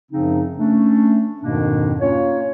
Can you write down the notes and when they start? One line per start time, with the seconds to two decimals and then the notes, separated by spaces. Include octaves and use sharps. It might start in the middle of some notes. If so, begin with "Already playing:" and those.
0.12 F#2 C#3 F3 C4 D#4
0.58 A3 C#4 D4
1.42 F2 G#2 B2 D#3 A#3 D4
2.00 A#3 C#4 F4 C#5